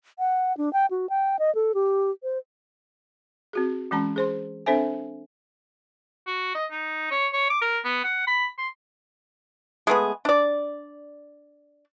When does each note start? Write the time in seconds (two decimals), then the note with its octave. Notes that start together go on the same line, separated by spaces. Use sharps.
0.19 F#5
0.57 D4
0.73 G5
0.90 F#4
1.09 G5
1.39 D#5
1.55 A4
1.74 G4
2.23 C5
3.53 C4 F#4 G#4
3.91 E3 G#3 C#4 A5 A#5
4.16 G#4 C5 C6
4.66 C4 D4 A4 C5 E5 G#5
6.27 F#4
6.55 D#5
6.71 D#4
7.11 C#5
7.33 C#5
7.50 D6
7.61 A#4
7.85 B3
8.04 F#5
8.27 B5
8.58 C6
9.87 G#3 A3 B3 G#4
10.25 D4 D5